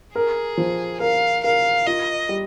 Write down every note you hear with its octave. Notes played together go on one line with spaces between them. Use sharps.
G#4 A#4
F3
A#4 F5
A#4 F5
F4 D#5
G3